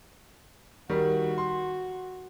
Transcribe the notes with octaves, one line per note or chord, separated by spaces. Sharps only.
D#3 G3 F#4
C6